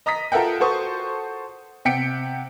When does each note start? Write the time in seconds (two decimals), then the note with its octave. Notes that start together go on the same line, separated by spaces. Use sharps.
0.06 D#5 A#5 D#6 A#6 B6
0.32 F4 A4 A#4 E5 F#5 G5
0.60 F#4 A4 C5 C#6 D#6
1.85 C3 F#5 G5 B6 C#7 D7